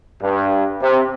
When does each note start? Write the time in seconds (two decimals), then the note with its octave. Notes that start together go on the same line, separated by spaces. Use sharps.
0.21 G2
0.81 C3